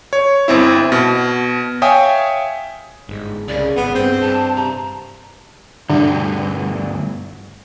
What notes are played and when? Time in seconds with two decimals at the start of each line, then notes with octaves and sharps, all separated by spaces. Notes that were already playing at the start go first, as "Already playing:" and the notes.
0.13 C#5
0.48 G1 C4 E4
0.92 B2
1.82 C#5 E5 F5 G5 G#5 D#6
3.09 G1 G#2
3.48 C2 C#3 D5
3.77 G#1 B3 G#4
3.95 G2 C4
4.21 G2 A5
4.56 C3 A#5
5.90 D2 G2 D3